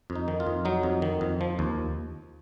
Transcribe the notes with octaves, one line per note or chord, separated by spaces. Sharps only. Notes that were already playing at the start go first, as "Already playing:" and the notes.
F2
D#4
D#3
F4
F2
F#3 D#4
F2
D#3
F2
F3
D#2